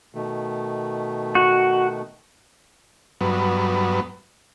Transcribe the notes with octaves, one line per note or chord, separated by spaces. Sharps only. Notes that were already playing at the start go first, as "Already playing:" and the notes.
B2 D#3 A3
F#4
G2 F#3 B3